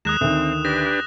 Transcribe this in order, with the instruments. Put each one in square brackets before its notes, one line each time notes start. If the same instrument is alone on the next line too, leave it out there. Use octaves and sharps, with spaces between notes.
[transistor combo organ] D#2 G#3 A#5 [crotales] D#6 F#6 E7
[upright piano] D2 D#3 [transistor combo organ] C4
[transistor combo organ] D4 G4 B4 [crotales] A#6